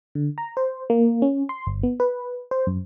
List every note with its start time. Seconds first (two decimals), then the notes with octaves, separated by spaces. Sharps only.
0.15 D3
0.38 A#5
0.57 C5
0.90 A#3
1.22 C#4
1.49 C6
1.67 G1
1.83 B3
2.00 B4
2.51 C5
2.67 F#2